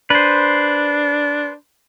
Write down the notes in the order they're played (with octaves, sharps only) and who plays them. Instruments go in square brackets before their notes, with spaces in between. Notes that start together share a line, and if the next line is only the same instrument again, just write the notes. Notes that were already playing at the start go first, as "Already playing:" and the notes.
[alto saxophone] D4 [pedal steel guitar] B4 C5